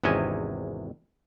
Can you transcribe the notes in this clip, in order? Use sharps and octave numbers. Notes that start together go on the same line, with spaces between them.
G#1 E2 C3 C#4 D#5 G#5